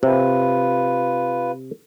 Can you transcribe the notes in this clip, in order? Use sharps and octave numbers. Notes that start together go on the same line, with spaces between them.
C3 F4 B4